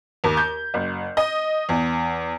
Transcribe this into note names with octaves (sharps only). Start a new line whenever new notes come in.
D#2
G6
F#1
D#5
E2